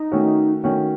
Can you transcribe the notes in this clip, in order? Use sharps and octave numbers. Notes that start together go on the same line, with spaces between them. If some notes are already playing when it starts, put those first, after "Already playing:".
Already playing: D#4
D#3 A3 C#4 F#4
D#3 A3 C#4 F#4